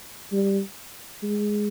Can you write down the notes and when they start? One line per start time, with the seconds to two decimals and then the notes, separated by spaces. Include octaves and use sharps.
0.32 G3
1.23 G#3